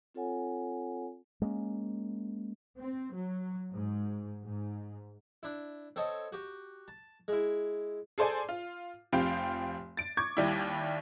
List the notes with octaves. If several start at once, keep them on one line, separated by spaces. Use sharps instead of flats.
C4 F4 A4 C#5 F#5 G#5
G#3 A#3 C4 C#4
C4
F#3
G#2
G#2
D4 E4
C4 A4 C#5 D#5
F#4 G4
A5
G#3 E4
G#4 A4 C5 D5 G#5
F4
F1 F3 C4 G4 F5 G5
A6 D7
C#6 D6 G#6
D#2 G3 E4